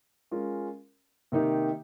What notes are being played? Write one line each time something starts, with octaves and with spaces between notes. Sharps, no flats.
G#3 C#4 F4 A#4
C3 D#3 A#3 D#4 G4